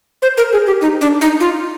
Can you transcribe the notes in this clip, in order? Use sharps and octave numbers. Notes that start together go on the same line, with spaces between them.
C5
A#4
G#4
G4
D#4
D4
D#4
F4